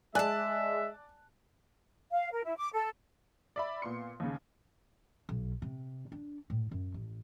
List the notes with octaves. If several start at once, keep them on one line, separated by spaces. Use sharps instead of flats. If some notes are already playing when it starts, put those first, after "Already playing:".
G#3 D5 E5 G#5 A5 F#6
F5
A#4
E4
D6
A4
D5 E5 B5
A#2 B3 C6 C#7
D#2 C#3
B1
C3
D4
A2
F#2
A1